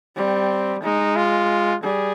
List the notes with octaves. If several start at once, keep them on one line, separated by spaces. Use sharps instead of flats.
G3 C4
G#3 D#4
F4
G3 G#4